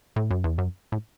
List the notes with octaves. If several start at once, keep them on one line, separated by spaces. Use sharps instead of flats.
A2
F#2
E2
F#2
A2